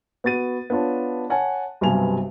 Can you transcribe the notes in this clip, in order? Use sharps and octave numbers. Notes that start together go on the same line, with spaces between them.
B3 F#4 A6 D#7
B3 D4 F4 C#5 A5
C#5 F#5 G#5 A5
B1 G2 C3 B3 G#5 F7